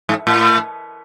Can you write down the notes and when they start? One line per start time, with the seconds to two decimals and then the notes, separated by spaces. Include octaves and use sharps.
0.09 G#2
0.27 A2